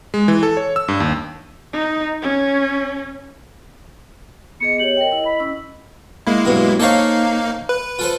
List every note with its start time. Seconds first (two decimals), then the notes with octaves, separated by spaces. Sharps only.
0.14 G#3
0.28 E3
0.43 A4
0.57 C#5
0.76 E6
0.88 G2
1.00 D#2
1.73 D#4
2.22 C#4
4.61 B3 G#4 D#5 C#7
4.80 G4 C#5 F#7
4.97 A#4 D#5 G5
5.12 E4 D#5
5.25 B5
5.40 C#4 E6
6.27 G#3 A#3 E4
6.46 B1 G2 B2
6.80 A#3 D#4 A4 C5 C#5 F5
7.69 B4
7.99 F4 A4 C5